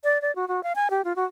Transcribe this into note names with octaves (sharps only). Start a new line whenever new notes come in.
D5
D5
F#4
F#4
F5
G#5
G4
F4
F#4